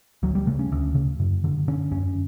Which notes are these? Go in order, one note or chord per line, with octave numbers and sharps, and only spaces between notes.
D2 F#3
G3
C#3 A3
C#4
D2
C#3
F#2
D3
D3 C#4
F#2 C#4